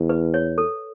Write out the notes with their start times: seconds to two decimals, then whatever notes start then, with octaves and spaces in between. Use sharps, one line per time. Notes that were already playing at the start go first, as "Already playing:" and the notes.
Already playing: E2
0.09 B4
0.34 C#5
0.58 A4